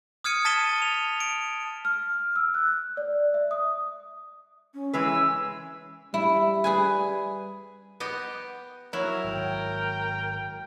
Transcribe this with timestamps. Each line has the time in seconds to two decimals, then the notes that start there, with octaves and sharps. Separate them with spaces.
0.24 D#6 F6 G#6 C#7 D#7
0.45 A5 A6 B6 D#7 E7 G7
0.82 F7
1.20 D7
1.85 F6
2.36 E6
2.54 F#6
2.97 D5
3.34 E5
3.51 D#6
4.74 C#4
4.93 E3 G#3 B4 E6
6.14 G3 E4
6.64 G#4 B4 G#5
8.00 B3 G4 D#5
8.93 F#3 E4 A#4
9.24 G#1 G5